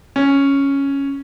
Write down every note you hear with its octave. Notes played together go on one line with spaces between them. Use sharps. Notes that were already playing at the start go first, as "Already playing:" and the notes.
C#4